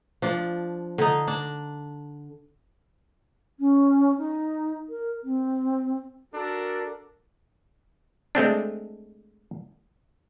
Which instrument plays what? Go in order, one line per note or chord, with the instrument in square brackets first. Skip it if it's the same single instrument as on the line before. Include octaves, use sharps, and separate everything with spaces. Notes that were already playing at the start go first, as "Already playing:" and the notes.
[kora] F3 D4
D3 D#4
D4
[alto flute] C#4
D#4
A#4
C4
[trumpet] D4 [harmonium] F#4 A4 A#4
[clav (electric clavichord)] G#3 A3 C4 D4